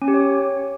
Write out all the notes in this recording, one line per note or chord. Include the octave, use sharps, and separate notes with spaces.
C#4
G4
C#5